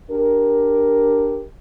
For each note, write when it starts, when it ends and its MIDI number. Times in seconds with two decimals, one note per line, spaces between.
0.11 1.44 62
0.11 1.44 67
0.11 1.44 70